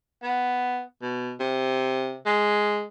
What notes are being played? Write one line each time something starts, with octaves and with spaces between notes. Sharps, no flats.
B3
B2
C3
G#3